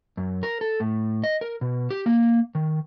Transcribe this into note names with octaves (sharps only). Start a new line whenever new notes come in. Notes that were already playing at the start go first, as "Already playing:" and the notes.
F#2
A#4
A4
A2
D#5
A#4
B2
G4
A#3
D#3